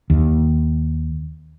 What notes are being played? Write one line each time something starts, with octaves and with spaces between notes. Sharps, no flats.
D#2